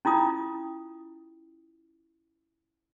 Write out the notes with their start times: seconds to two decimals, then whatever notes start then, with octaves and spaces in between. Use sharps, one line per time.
0.05 C#4 E4 F4 D#6